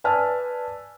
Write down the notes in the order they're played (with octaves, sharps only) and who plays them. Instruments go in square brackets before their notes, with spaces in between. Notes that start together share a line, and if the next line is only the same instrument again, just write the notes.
[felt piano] B4 D5 G#5 A5 E6 F6